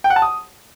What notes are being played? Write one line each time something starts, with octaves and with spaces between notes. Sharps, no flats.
G5
F#5
A5
D#6